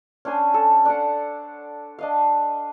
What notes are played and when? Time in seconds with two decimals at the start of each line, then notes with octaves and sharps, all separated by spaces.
0.25 C#4 D4 C5 G#5
0.54 A4
0.85 D4 D5 F#5
1.99 D4 D#5 F5